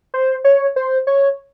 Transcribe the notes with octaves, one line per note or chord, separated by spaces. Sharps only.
C5
C#5
C5
C#5